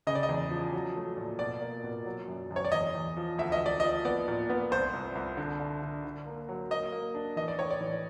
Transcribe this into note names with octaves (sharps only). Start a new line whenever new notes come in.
C#3 D#5
D5
D#5
E2
F3
F#3
A3
A#2
B2 D5
A#3
B2
F#3
F#2
F#2
C#5
D5
E2 D#5
E2
F3
D2 E5
D#5
D2
D5
F3 D#5
B3 D5
A#2
B3
C2 C5
C2
C2
D3
D3
D3
D3
A#3
F#3
A#3 D#5
A#3
D4
E3 D#5
D5
A2 C#5
D5
E3